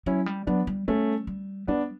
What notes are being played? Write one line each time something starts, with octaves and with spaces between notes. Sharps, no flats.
F#3 C#4 E4
G3
F#3 B3 D4
G3
G3 A3 C#4
G3
G3 B3 D4